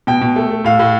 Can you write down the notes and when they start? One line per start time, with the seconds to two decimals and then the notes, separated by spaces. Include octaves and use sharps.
0.07 B2 G5
0.22 B2
0.36 A3
0.51 A3
0.64 A2 F5
0.79 A2